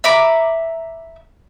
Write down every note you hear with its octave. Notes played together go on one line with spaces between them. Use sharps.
E5 A#5 B5 D6